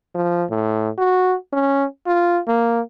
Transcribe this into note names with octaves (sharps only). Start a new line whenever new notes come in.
F3
A2
F#4
C#4
F4
A#3